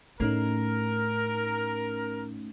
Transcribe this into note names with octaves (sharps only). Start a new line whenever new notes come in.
A2 A3 C#4 D#4 A#4